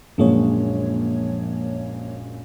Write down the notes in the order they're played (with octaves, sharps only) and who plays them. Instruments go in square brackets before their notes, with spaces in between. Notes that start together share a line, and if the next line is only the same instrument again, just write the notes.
[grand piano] A#1 F#2 G#3 [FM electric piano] F3 A#3 C#5